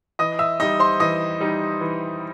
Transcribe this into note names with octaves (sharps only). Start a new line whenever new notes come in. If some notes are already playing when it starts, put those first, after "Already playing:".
E3 D#5 D#6
E5 E6
G3 D#4 D#5 D#6
C5 C6
E3 D#5 D#6
G3 D#4
E3